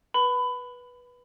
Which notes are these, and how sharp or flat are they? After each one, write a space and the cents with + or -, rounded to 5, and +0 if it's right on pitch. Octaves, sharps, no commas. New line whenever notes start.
B4 -15 B5 +25